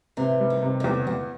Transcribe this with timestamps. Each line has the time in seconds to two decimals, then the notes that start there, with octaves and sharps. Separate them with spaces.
0.17 C3 E3
0.40 G3
0.50 D#3
0.63 C3
0.80 D#3
0.84 E2 D3
1.07 E2 C#3